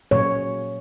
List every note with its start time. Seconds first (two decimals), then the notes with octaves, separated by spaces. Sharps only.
0.11 A#2 F#3 A#3 C#5